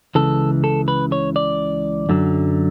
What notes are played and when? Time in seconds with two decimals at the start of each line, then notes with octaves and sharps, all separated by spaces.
0.15 C#2 C#3 E3 A4
0.64 A4
0.88 B4
1.12 C#5
1.36 D5
2.09 F#2 D3 F#3